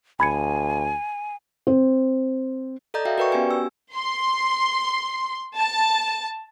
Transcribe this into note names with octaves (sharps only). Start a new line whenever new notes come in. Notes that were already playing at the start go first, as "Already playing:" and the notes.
D2 G#5 B5 G#6 C#7
C4
A4 D5 D#5 A#5 G6
F#4 E5 F5 G5
F#4 A#4 B4 D5 G5 C#6
B3 C#4 F#4 G4 G#5
E6
C6
A5